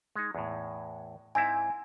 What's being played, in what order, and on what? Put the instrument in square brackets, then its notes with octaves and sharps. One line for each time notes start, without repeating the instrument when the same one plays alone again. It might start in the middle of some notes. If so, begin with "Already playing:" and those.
[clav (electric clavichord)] G#3 D#4
E2 A2
[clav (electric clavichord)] G#2 C4 E4 [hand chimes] G#5